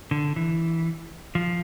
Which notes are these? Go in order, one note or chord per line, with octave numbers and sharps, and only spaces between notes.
D3
E3
F3